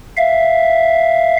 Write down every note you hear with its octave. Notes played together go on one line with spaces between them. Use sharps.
E5 F5